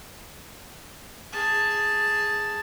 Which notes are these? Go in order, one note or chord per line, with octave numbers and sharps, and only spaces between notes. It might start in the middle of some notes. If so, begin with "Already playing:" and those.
G#4 A5